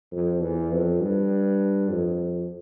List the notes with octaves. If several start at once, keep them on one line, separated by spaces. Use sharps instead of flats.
F2
E2
F2
G2
F2